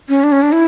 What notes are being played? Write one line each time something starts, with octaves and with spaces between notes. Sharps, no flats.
C#4
D4
C#4
D4
E4